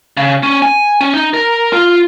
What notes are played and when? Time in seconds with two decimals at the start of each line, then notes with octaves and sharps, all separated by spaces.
0.17 C#3
0.43 C#4
0.62 G#5
1.01 C#4
1.14 D#4
1.34 A#4
1.73 F4